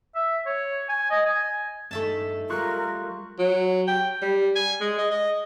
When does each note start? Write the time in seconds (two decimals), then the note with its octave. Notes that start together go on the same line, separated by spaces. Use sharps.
0.15 E5
0.46 C#5
0.89 G#5
1.11 D#5
1.26 G#5
1.91 G2 A3 D#4 E5 A5
2.50 G3 G#3 F4 A#4 C#6 F#6
3.38 F#3
3.87 G5
4.22 G3
4.55 G#5
4.80 G#3
4.98 D#5
5.11 D#5